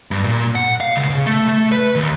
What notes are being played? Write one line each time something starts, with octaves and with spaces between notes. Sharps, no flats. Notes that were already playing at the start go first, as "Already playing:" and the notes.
G2
A#2
F#5
F5
C#2
C#3
A3
A3
B4
D#2